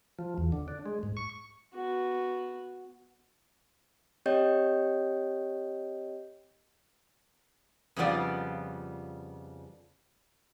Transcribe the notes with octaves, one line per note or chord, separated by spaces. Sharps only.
F3
E2
D3
D4
G#3
G#2
C#6
B3 F#4
C4 G4 C#5 D#5 G5 G6
F2 C#3 G3 B3 F4 D5